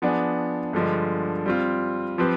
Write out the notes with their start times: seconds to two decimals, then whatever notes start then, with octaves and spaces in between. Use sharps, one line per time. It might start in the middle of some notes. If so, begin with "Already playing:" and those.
0.02 F3 B3 D4 G#4
0.73 G2 D3 F3 G#3
1.46 G3 C4 F4
2.18 F3 C4 G4 B4